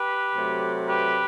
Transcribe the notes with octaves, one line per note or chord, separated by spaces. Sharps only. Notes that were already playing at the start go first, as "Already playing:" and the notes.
Already playing: G4 B4
C3 F#3 A3
G4 B4